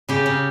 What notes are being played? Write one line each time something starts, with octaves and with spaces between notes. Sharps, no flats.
C#3 G4
C#3